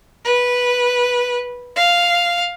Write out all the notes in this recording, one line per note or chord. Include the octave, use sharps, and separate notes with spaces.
B4
F5